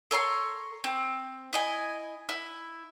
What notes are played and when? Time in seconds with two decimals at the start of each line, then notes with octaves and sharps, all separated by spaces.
0.11 A4 C#5 A#5 C6
0.84 C4
1.53 E4 D#5 G#5
2.29 E4